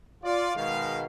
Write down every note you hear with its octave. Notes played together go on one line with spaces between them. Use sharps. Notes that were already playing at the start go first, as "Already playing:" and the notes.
F4 D5
B2 D#3 G#3 F5